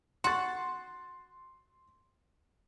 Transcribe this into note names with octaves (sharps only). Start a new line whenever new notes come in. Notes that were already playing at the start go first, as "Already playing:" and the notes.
F#4 C6 A6